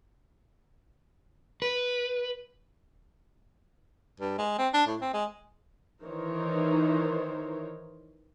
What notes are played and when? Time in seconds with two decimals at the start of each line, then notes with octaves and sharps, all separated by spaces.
1.62 B4
4.20 G2
4.38 G#3
4.58 C4
4.74 D4
4.87 A2
5.01 C4
5.14 G#3
6.04 D#3 E3 D#4 A#4 C5 C#5